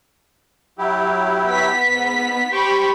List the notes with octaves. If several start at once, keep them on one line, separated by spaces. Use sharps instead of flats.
F#3 E4 G4
B3 B6
G#2
G4 C5 G5 B5 C#6